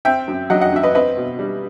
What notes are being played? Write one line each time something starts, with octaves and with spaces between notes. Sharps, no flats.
C4 E5 G5
F#2
F#3 D#5 F#5
D#5 F#5
F#2 E5
B4 D#5
C4 B4 D#5
B2
G3